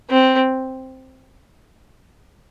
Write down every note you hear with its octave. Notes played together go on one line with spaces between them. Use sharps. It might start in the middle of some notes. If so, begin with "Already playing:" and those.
C4